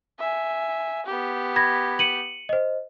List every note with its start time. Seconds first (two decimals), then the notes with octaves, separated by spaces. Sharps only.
0.19 E5 G#5
1.06 B3 G4
1.56 B5 G#6 A#6
1.99 C#7 D#7 F#7
2.49 C5 D#5